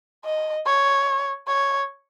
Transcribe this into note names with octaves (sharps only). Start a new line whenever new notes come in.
D#5
C#5
C#5